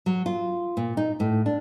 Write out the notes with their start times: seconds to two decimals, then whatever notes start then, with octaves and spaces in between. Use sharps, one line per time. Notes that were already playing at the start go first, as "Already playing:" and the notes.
0.06 F#3
0.26 F4
0.77 A#2
0.97 D#4
1.20 A2
1.46 D4